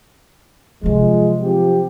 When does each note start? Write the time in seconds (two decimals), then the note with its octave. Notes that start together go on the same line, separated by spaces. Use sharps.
0.83 C3 F3 F#3 G#3
1.41 F3 C4 G4